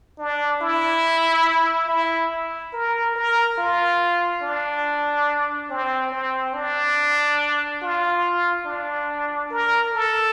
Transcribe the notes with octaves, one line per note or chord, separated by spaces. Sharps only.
D4
E4
E4
A#4
A#4
F4
D4
C4
C4
D4
F4
D4
A#4
A4